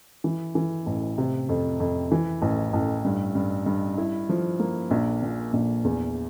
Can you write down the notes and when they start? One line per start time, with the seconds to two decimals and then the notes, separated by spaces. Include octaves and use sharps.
0.24 E3
0.55 E3
0.86 A1
1.18 C3
1.49 F2
1.80 F2
2.12 E3
2.42 A1
2.73 A1
3.05 G2
3.35 G2
3.66 G2
3.98 E4
4.29 F3
4.60 A#3
4.91 A#1
5.23 A#2
5.53 A#1
5.84 E2